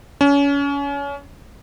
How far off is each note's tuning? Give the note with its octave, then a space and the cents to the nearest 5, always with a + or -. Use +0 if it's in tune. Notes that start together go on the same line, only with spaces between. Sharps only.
C#4 +30